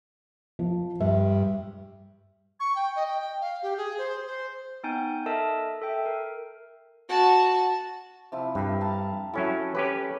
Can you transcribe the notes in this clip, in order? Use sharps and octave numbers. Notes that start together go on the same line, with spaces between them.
F3
G2 E5
C#6
G5
D#5
G5
F5
G4
G#4
C5
C5
B3 D#4 G5 G#5 G6
A4 A#4 D#5 E5 A5
A4 E5 G5
A#4
F#4 A5
C3 F3 E4
G2 G4 E5 B5
F5 A5 A#5
F#3 C#4 E4 A4
C#4 G4 B4